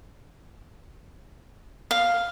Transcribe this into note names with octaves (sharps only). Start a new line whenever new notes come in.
F5